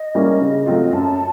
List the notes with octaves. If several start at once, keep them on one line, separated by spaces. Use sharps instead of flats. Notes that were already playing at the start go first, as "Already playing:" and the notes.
Already playing: D#5
G3 A#3 C#4 E4
C#3
F#3 A3 C4 F4
F#2 A5